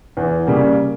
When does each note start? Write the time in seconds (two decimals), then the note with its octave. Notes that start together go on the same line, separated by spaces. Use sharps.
0.17 E2
0.47 C#3 G3 A#3